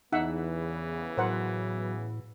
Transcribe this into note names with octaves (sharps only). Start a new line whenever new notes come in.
E2 C#3 E3 B3 D#4 E5 F#5
A2 F#3 A#4 C5 F#5